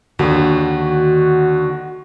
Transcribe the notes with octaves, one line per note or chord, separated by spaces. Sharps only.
D#2 D3 D#3 F#4